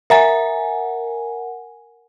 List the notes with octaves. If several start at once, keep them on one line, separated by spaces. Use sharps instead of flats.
A#4 E5 F#5 G#5 A#5 A6